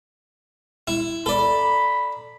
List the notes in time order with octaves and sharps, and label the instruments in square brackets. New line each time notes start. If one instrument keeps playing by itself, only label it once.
[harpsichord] E4
[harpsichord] A4 D5 [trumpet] B5